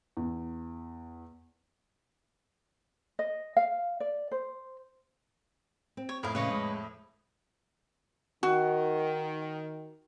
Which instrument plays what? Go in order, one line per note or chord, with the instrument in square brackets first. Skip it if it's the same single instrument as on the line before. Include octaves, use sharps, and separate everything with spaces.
[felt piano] E2
[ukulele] D#5
F5
D5
C5
[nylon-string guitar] C4
[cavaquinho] C#5
[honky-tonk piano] F2 A2 B5 [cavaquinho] A#4 F5
[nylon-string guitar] A#2 C#3 [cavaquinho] B4 C#5 D#5
[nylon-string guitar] G#3
[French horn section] D#3 [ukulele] F#4